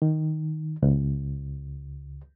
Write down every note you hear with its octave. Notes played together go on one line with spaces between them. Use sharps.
D#3
C#2